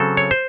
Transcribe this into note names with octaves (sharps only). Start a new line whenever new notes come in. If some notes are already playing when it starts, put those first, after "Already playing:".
Already playing: C#3 F#3 C4 A4
C#5
C5